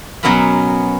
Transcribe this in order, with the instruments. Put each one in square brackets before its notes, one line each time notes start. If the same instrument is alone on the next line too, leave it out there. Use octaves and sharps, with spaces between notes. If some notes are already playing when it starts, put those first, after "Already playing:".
[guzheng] B2 F#3 B3 C#4 A#4 B5